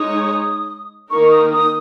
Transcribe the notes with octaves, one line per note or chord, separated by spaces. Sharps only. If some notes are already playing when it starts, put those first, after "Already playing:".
Already playing: G#3 D#4 G#4 C#5 D#6
D#3 A#3 D#4 A#4 C#6
D#6
D#6